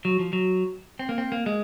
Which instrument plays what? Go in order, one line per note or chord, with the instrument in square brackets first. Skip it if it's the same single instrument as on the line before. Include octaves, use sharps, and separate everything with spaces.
[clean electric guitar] F#3
F3
F#3
C4
A#3
C4
A#3
G#3